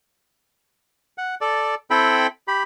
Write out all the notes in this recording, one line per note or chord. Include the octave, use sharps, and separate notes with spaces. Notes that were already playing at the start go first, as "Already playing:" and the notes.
F#5
A4 D5
C4 E4 A4 G5 B5
G4 B5